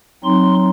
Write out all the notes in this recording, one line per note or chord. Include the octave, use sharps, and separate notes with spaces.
F#3 C4 D#4 C6